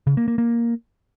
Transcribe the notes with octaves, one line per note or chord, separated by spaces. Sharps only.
C#3
A#3
A#3
A#3